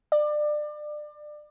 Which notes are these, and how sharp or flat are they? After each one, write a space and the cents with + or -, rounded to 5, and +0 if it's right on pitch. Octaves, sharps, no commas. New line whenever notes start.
D5 +30